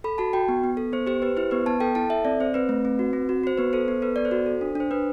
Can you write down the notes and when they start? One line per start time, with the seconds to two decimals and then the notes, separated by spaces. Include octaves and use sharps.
0.04 A4 B5
0.18 F#4 A5
0.33 F#4 G5
0.49 B3
0.64 B3
0.77 A4
0.93 B3 C5
1.07 G4 C5
1.22 G4 B4
1.37 E4 C5
1.51 B3 B4
1.66 B3 A5
1.80 A4 G5
1.95 E4 A5
2.10 A4 E5
2.25 C4 D5
2.40 C4 C5
2.54 C4 B4
2.69 A3
2.85 C4
2.99 F#4
3.13 C4
3.29 F#4
3.44 F#4 C5
3.58 B3 B4
3.73 A4 C5
3.88 B3
4.02 A4 B4
4.16 B3 D5
4.25 C5
4.31 F#4
4.46 A4
4.61 D4
4.75 D4 C5
4.91 D4 B4